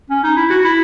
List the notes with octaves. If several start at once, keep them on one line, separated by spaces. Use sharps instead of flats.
C#4
D#4
E4
F#4
E4